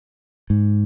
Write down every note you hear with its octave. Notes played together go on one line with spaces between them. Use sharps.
G#2